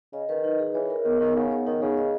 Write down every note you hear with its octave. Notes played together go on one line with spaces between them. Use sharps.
C#3 D#5
D#3 B4
D#4
G#4
E3 C#5
A#4
D#3 B3
D#3 D#4
C#3 F#5
C#5
D#3 D#4
C#3 G#4
D#5